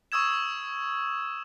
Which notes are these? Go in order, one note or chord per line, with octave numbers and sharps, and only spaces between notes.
C#6 D#6 E6 G#6 E7